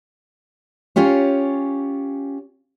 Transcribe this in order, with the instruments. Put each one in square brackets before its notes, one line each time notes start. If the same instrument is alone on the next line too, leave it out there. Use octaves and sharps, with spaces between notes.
[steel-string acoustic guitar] C#4 F4 G4 C#5